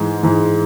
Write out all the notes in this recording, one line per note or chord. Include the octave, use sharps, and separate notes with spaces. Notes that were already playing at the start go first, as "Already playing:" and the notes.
Already playing: G#2 E3 G#3
G#2 E3 G#3